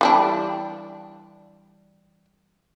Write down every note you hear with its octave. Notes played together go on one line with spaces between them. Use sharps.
E3 G3 D4